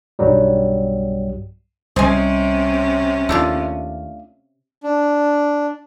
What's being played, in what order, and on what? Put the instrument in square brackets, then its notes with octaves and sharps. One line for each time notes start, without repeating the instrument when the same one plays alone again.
[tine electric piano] B1 G2 F#3 G3
[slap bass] C2 [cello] C3 C#4 [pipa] C5 D#5 G#5
[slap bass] D#2 [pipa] A3 D4 F4
[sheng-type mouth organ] D4